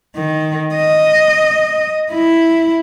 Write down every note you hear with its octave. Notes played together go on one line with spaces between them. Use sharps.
D#3
D#5
E4